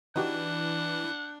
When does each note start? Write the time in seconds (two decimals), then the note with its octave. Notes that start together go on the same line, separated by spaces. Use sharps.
0.16 E3 D4 D#4 F#4 G4 F#5